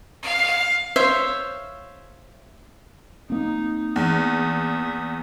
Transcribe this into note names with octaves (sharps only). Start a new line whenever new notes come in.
F5
C5 C#5 E5 F5
A#3 C4 D#4
E2 E5 D#6